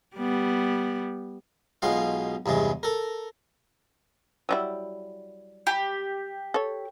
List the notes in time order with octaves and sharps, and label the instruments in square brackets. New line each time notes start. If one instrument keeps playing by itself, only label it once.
[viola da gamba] G3 B3
[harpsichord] B1 B2 G#3 F4 F5
E2 G2 C3 G#3
A4 A#4
[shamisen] F#3 G3 E4
[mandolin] G4
[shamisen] A4 C#5